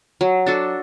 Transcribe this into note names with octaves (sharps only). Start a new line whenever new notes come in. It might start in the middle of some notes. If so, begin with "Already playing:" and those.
F#3
D4 F#4 A4